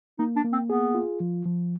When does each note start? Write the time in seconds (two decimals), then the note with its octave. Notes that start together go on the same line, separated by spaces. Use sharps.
0.19 A#3 D#4
0.36 D4
0.44 A#3
0.53 C4
0.70 B3 G#4
0.95 F4
1.20 F3
1.45 F3